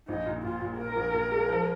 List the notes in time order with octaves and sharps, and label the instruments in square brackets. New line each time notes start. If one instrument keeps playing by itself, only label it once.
[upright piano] A#1 [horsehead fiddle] D#4
[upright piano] A#2
[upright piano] A#2 [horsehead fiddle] F4
[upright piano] A#2
[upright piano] A#2 [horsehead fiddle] A#4
[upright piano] A#1
A#2
G#3
F3